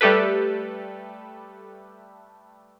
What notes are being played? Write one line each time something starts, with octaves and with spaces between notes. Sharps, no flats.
G3 A3 G4 A4 B4